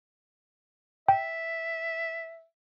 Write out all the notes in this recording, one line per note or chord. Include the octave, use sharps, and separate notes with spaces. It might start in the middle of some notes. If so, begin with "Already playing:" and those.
E5 G5